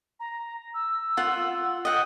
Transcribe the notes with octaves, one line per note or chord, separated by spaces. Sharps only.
A#5
E6
F4 F#5
D#5 F#5 G5